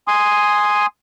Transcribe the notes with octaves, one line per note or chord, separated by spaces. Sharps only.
G#5 C6 D#6